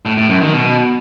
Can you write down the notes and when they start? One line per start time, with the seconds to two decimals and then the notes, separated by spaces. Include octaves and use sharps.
0.06 A2
0.17 A2
0.29 F#2
0.41 D#3
0.53 B2